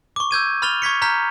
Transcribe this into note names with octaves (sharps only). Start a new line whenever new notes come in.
C#6 D6
E6 G6 G#6 D#7
B5 F6 A6 F7 G7
C#6 G#6 B6 C#7
A#5 F6 G6 B6